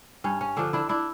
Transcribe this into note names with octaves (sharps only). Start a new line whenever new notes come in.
G2 C#4
C#4
D3 F3 D4
D4 E4
D4 E4